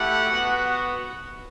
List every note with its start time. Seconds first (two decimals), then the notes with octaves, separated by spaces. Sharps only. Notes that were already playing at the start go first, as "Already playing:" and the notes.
Already playing: A3 E4 G4 F#5
0.27 B3 F#4